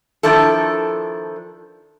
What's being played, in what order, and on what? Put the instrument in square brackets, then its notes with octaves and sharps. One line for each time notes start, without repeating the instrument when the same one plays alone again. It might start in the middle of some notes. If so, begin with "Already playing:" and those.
[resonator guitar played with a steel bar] D#3 F3 D4 E4 A4